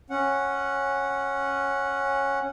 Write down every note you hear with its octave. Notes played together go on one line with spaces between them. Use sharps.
C#4 F#5